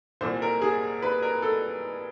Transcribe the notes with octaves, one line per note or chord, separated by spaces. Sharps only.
C2 A#2 F3 C5
A#4
G#4
B4
A#4
A4